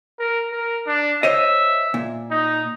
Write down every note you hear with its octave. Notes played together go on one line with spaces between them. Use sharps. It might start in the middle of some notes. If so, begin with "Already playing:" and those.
A#4
A#4
D4
C5 C#5 D#5 E5
A#2
D#4